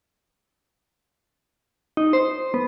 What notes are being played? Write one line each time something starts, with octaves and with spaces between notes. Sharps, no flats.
D#4
C5
B3